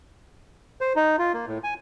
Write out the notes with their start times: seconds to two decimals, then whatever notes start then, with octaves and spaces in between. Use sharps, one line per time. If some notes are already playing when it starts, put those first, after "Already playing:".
0.81 C5
0.96 D#4
1.19 F4
1.34 A#3
1.47 A2
1.64 G#5